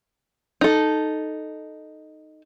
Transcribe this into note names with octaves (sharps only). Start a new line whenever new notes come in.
D#4 A4